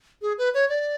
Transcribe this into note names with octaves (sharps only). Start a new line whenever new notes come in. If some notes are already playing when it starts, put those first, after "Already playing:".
G#4
B4
C#5
D5